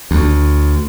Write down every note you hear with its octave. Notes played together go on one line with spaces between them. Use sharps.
D2